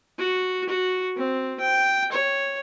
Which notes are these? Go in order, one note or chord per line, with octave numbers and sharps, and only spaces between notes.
F#4
F#4
C4
G5
C#5